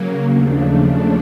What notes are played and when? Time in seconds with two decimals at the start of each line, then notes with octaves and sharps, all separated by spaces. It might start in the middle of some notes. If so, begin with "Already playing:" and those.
Already playing: C#3 F#3 A#3
0.31 D#2 C#3 F3 A3 D4